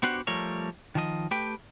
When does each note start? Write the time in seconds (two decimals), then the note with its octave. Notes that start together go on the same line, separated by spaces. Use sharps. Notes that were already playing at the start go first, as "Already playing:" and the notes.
0.03 B3 D4 F#4 G4 C5 F#5
0.27 F3 G3 A3 A#4 C#5
0.95 D#3 F3 D#5
1.31 A3 G4 B4 G5